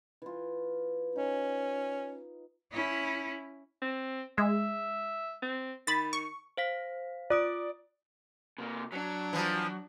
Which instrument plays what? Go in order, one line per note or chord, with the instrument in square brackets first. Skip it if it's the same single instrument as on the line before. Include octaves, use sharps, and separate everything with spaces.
[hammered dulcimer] E3 F4
[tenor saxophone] C#4 [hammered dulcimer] D#4
[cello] C#4 E4
[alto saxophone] C4
[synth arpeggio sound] G#3 [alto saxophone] E5
[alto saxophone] C4
[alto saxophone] D#3 [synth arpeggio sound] B5 A6
[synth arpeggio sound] C#6
[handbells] C5 F5 B6
[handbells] F4 D#6 D7 [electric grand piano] D5
[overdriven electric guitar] C3 A#3
[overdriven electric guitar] F#3 [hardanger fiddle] D4
[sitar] E3 F3